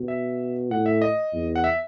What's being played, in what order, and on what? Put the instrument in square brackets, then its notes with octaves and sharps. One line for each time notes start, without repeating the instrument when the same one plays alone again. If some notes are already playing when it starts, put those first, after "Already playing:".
Already playing: [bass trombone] B2
[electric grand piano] E5
[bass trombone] A2 [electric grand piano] F#5
[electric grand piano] E5
D#5
[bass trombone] E2
[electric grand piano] F#5
E5